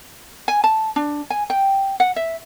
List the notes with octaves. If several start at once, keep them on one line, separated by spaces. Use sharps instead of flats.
G#5
A5
D4
G#5
G5
F#5
E5